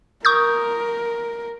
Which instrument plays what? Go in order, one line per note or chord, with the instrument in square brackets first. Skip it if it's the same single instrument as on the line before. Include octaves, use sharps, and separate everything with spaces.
[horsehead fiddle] A#4 [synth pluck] C#6 D#6 G6